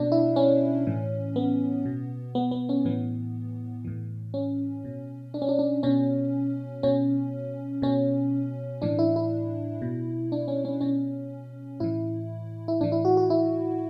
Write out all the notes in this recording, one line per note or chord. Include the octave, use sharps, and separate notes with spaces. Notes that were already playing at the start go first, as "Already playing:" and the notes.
Already playing: B2 D4
E4
C#4
A2 E3
B3
B2
B3
B3
C#4
A2 E3 B3
A2 E3
C#4
B2
D4
C#4
D4
D4
B2 C#4
B2 C#4
B2 C#4
A2 E3 D4
E4
E4
B2
D4
C#4
C#4
B2 C#4
A2 E3 E4
E4
A2 E3 D4
E4
F#4
F#4
E4